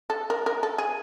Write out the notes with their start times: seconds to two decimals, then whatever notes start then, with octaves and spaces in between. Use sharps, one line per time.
0.10 A4
0.30 A#4
0.46 A#4
0.63 A4
0.78 G#4